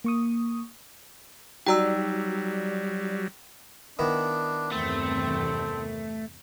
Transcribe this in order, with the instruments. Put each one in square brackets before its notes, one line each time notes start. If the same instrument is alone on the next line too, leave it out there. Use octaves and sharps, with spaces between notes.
[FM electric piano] A#3 C#6 D#6
[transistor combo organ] F#3 G3 [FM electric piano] D#4 F#4 D5 [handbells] G5 A#5 E6
[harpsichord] D#3 B3 E4 [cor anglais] D4
[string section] E2 G2 C3 [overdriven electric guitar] A3 [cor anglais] C4